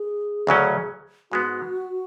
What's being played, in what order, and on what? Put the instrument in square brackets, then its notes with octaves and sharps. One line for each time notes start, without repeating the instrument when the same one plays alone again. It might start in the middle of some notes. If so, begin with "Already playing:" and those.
Already playing: [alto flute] G#4
[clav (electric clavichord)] D2 C#3 F#3 C#4
[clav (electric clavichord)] G#2 G#3 B3 [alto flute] F#4